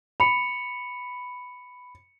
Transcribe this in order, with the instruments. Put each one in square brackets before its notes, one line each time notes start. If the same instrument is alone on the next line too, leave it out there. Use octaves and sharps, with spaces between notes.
[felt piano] B5 [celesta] C#7 F7